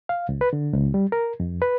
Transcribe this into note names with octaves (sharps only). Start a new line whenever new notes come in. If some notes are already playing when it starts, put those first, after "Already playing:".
F5
C#2
B4
D3
C#2
G3
A#4
F2
B4